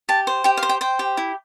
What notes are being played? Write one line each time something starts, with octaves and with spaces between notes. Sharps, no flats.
G4 A5
C5
G4 G5
F5
C5
G5
C5 G5
G4
E4